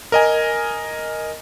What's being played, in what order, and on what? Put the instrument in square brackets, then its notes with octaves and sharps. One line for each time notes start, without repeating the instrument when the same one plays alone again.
[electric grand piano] A#4 D#5 G#5